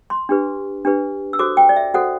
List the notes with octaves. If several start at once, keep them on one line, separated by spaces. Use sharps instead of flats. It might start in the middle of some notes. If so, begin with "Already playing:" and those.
C6
D4 G4 B4
D4 G4 B4
E6
F#4 A4 C5 D6
G5
D5
E5
F#4 A4 C5 F#5